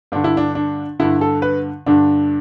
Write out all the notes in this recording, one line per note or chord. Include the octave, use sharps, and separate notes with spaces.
G2 D3 D4
E4
D4
D4
G2 D3 E4
A4
B4
G2 D3 D4